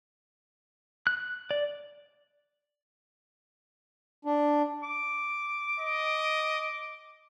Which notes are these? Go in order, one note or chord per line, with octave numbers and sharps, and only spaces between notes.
F#6
D5
D4
D6
D#5